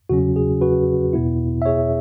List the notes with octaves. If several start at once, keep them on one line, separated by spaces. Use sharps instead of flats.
E2 C#3 F#3 C#4 F#4
G#4
F#4 B4
E2 B2 B3 E4
E5
G#4 C#5